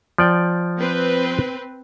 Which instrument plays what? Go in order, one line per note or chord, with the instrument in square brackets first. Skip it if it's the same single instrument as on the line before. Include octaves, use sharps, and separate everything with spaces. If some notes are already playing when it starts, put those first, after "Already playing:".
[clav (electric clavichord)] F3 D5 G5
[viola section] C4 B4